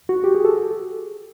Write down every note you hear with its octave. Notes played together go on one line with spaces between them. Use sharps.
F#4
G4
G#4
A4